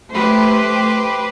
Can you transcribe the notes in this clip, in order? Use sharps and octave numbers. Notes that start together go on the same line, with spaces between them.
A3 G4 B4 C5